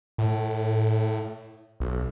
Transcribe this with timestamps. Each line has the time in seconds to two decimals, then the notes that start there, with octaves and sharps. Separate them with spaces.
0.18 A2
1.80 B1